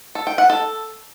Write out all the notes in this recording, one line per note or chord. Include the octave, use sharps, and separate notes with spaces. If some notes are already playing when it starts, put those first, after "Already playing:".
A4
G5
F#5
A4